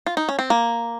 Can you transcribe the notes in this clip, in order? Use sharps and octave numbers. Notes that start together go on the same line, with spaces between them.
F4
D#4
C#4
C4
A#3